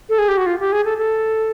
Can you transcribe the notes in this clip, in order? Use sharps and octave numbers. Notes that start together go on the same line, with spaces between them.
A4
G#4
G4
F#4
F4
G4
G#4
A4
A4